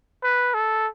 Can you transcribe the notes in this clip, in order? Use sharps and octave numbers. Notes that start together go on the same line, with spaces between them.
B4
A4